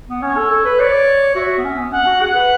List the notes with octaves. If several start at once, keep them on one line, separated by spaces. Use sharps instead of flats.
B3
C#4 C#5
A4
A4
B4
C#5 D5
F#4 E5
B3
C#4
B3
C#4 F#5
F#4
G#4 F#5
B4